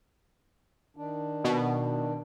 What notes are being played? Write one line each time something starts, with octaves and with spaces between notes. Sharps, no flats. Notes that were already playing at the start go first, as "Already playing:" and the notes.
D#3 D4
B2